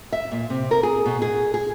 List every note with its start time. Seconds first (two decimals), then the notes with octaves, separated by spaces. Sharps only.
0.12 E5
0.31 A#2
0.50 C3
0.71 A#4
0.83 G#4
1.06 B2
1.22 G#4
1.54 G#4